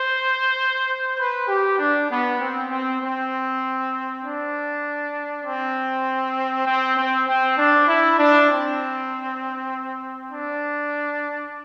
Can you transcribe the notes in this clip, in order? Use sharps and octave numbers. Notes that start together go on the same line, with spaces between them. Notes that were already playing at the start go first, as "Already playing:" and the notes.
Already playing: C5
B4
G4
D4
B3
C4
C4
C4
D4
C4
C4
C4
C4
D4
E4
D4
C4
D4